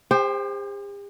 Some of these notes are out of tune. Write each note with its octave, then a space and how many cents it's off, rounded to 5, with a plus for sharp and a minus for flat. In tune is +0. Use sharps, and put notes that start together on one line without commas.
G4 +45 C5 +5 G5 +5